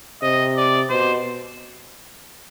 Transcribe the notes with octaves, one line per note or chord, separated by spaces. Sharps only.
C3 D#5
D5
B2 C5